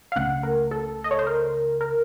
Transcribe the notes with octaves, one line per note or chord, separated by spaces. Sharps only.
F5
C#2 C#3 A3 C#4 F#5
A#4
A4
D#5
C#5
C5
A#4
A#4